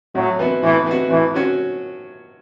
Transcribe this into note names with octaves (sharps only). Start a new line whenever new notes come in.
A2 F#3
E3 B3 F#4
A2 E3
E3 B3 F#4
A2 E3
F#3 C#4 F#4